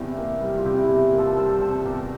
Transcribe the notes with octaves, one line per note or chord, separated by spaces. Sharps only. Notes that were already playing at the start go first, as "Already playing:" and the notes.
Already playing: E2 C3 G3 E4 G4 A4
A#3
G3
F4
C3 E4 G4
E4
E2
A#3
F4 A4
G3 A4 C5
C3 A4 C5
E2 G4 A4 A#4
A#4